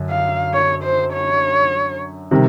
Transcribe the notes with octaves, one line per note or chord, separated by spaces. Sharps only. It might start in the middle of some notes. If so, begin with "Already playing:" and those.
Already playing: F#2 D3
F5
C#5
C5
C#5
C3 D#3 G3